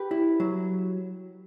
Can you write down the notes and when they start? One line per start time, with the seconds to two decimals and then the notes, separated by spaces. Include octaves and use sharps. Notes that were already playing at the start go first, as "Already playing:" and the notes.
Already playing: G4 B4
0.11 E4
0.40 F#3